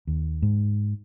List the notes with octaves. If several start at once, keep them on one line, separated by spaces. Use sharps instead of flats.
D#2
G#2